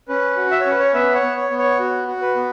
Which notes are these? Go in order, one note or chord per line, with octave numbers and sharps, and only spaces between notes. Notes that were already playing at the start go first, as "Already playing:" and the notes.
C#4 B4
F#4
E5
C#5
C#4 B4
C#5
B3 B4 E5
C#5 F#5
B3
C#5
B3
C#5
F#4
F#4
B4
B3